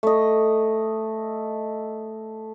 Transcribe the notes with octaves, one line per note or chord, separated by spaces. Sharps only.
A3 D#5